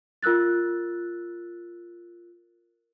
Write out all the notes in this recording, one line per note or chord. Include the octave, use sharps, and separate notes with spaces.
F4 A#4 E6 F#6 A6